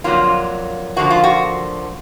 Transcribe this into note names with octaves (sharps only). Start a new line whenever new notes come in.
F2 D3 F#3 A#3 F4
D3 F3 A#3 F#4
F4
F#4